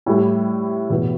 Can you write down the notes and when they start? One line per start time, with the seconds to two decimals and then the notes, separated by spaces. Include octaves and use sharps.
0.06 A2 G3 E4
0.90 E2 B2 B3